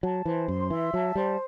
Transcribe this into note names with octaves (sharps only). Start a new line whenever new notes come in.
F#3 A5
E3 C5
F#2 C6
E3 E5
F#3 A5
G3 C5